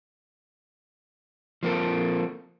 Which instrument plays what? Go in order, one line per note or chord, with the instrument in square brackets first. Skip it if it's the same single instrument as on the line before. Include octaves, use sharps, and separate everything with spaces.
[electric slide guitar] F3 A#3 C4 A4